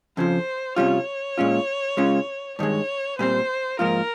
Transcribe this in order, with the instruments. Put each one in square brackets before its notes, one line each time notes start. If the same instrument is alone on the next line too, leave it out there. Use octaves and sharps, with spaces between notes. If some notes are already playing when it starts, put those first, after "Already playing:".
[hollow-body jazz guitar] F2 C#3 F3 [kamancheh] C5
[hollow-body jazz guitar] C3 G3 C#4 F4 [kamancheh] C#5
[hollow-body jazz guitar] A#2 G#3 C#4 F4
C#3 G#3 C#4 F4
[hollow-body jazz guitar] G2 D#3 G#3 [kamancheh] C#5
[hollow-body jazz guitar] A#2 G3 C4 [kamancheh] C5
[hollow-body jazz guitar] G#2 F3 A#3 F4 [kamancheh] A#4